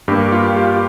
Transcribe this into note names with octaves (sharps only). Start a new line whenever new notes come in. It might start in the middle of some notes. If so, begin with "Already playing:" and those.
G2 G3 A#3 G4
F4
G4